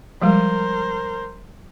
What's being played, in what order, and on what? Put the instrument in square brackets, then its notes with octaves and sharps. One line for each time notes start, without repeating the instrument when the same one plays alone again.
[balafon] F3 G3 G#3 [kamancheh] A#4 C5